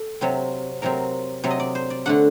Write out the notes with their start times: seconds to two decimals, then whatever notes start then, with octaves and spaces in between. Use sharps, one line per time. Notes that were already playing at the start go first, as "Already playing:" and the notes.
Already playing: A4
0.21 C3 F#3 C4
0.82 C3 F#3 C4 A#4
1.44 C3 F#3 C4
1.51 D#5
1.60 D5
1.75 C5
1.90 D5
2.06 D3 A3 D4 F#5